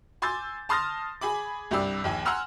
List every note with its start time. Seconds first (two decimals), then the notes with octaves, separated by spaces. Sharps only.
0.22 G#5 C6 D6 E6 G6 A6
0.69 A5 C6 D#6 F6 A6 A#6
1.21 G#4 G#5 B5 D6
1.71 C2 G2 G4 D5 E6
2.04 A#1 D#2 G#5
2.25 F#5 G#5 A#5 C6 E6 F6